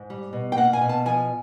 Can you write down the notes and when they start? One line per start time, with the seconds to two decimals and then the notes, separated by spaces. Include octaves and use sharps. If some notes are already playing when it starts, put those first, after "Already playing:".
Already playing: G#2
0.10 G3
0.33 B2
0.52 G5
0.57 A#3 F#5
0.73 G#5
0.81 B2
0.89 A5
1.05 F3 G#5